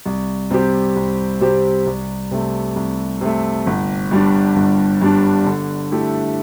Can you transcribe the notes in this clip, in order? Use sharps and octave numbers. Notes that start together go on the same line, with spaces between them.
C2
C3 G3 C4 G4
C2
C3 G3 C4 G4
C2
C3 A3
C2
C3 A3
G1
G2 G3 D4
G1
G2 G3 D4
D3
A3 E4 G4